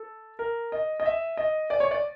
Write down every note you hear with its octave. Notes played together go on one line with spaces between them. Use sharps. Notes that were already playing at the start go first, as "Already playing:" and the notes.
Already playing: A4
A#4
D#5
D#5
E5
D#5
D5
C#5
D5